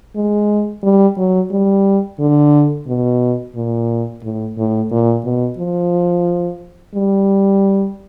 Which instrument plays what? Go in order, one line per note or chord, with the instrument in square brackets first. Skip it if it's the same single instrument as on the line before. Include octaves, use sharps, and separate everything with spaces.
[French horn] G#3
G3
F#3
G3
D3
B2
A#2
A2
A2
A#2
B2
F3
G3